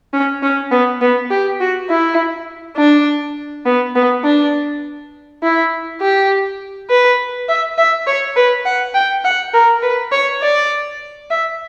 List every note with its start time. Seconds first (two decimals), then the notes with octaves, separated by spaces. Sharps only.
0.13 C#4
0.43 C#4
0.72 B3
1.01 B3
1.31 G4
1.61 F#4
1.90 E4
2.77 D4
3.66 B3
3.95 B3
4.24 D4
5.43 E4
6.01 G4
6.90 B4
7.49 E5
7.78 E5
8.07 C#5
8.36 B4
8.66 F#5
8.94 G5
9.25 F#5
9.54 A#4
9.83 B4
10.12 C#5
10.42 D5
11.31 E5